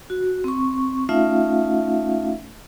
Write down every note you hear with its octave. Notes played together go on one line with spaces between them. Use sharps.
F#4
C4 C#6
A3 C#4 D#4 F4 E5 F5